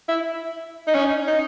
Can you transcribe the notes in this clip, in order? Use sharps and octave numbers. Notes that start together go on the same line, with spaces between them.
E4
D#4
C#4
D#4